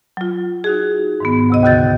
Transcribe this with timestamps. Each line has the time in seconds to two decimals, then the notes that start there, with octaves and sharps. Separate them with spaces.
0.17 F#3 F4
0.64 D#4 F#4 G#4
1.20 G#2 D#3 B3
1.50 D2 C3 D#5
1.63 D#2 B2 D3 F#4 G6 A6